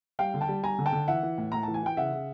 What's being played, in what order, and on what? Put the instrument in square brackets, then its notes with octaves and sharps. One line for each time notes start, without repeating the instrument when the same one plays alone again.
[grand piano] G3 F5 G5
D3
G5 A5
G3
G3 G#5 A#5
D3
G5 A5
D3
E3 E5 F#5
E3
A2
A2 A#5
E3 A5
G#5
E3 G5
C#3 E5 F#5
C#3